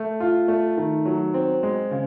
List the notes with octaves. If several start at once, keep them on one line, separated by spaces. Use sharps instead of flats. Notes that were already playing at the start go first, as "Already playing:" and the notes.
Already playing: A3
F4
A3
D#3
F#3
C4
G#3
C#3